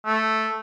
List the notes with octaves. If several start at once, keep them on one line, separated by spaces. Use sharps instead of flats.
A3